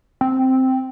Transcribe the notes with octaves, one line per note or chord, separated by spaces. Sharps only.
C4